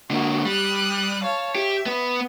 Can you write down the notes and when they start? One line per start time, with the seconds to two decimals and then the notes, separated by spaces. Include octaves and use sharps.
0.11 D3 A#3 F#4
0.45 G3 D#6 F#6
1.21 C#5 F5 A5
1.55 G4 E5
1.86 B3 B4